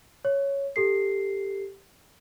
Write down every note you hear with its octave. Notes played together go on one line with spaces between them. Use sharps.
C#5
G4 A4 C7